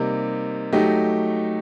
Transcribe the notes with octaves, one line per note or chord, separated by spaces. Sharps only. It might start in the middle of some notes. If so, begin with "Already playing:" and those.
Already playing: C3 G3 A#3 D#4
F#3 A3 D#4 G4